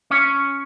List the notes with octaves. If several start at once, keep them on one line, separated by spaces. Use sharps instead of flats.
C#4 C#5